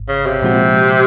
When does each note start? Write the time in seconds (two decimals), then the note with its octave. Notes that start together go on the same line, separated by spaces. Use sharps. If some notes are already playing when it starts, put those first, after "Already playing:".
Already playing: G#1 G#2
0.08 C#3
0.26 C3
0.42 A#2 F3 G#3 C4 F#4